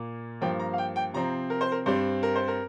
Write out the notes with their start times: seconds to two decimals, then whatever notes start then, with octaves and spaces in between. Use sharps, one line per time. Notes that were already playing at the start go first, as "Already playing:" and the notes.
Already playing: A#2 A#3
0.41 G2 F3 A#3 G5
0.60 A#5
0.73 F5
0.78 G5
0.96 G5
1.14 C3 F3 C4 A#5
1.50 A#4
1.61 C5
1.72 A#4
1.86 G2 G3 C4 C5
2.23 A#4
2.36 C5
2.48 A#4